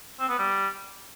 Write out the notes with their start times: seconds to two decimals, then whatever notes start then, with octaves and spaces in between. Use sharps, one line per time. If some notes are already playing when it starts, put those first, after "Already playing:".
0.20 C4
0.30 B3
0.39 G3